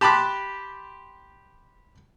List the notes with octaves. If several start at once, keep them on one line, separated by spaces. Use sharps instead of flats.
G4 A5 B5 C6 D6 F#6